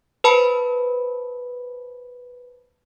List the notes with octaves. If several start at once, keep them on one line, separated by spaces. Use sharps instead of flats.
B4 C5 A5 B5